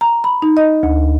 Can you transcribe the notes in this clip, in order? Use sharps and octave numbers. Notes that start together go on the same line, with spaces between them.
A#5
B5
D#4
D#5
D2